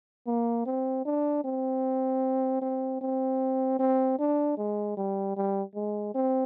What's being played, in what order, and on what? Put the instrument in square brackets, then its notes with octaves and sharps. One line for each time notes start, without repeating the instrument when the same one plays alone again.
[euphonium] A#3
C4
D4
C4
C4
C4
C4
D4
G#3
G3
G3
G#3
C4